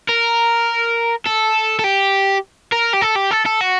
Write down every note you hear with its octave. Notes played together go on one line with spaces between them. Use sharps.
A#4
A4
A4
G4
A#4
G4
A4
G4
A4
A4
F#4